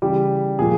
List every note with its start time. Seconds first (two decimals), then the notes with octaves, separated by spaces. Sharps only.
0.02 C#3 E3 G3 G4
0.59 A#2 F3 G#4